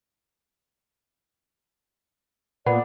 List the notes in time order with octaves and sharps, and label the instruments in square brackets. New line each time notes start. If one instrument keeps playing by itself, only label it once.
[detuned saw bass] A#2 [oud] B3 [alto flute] D5 [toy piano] F#5 B5